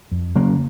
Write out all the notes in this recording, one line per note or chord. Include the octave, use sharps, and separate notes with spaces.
F2
C#3 F#3 A#3